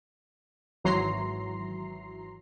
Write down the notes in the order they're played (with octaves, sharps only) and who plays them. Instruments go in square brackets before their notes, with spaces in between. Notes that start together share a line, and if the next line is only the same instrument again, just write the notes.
[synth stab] G#1 E3 F#3 A#5 C6 C7